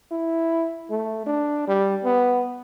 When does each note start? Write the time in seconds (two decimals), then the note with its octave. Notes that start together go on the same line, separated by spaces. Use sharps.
0.11 E4
0.90 A3
1.26 D4
1.68 G3
2.04 B3